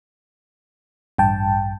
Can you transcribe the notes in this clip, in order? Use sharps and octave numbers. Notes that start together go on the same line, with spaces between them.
A1 G2 G5 A5